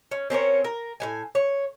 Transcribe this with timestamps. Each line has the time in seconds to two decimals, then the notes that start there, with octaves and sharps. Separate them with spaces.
0.11 C#4
0.30 C4 C#4 A#4 C#5
0.64 A#4
1.00 A2 B3 G#5
1.35 C#5